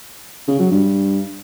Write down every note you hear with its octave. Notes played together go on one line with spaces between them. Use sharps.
C#3
F#3
G2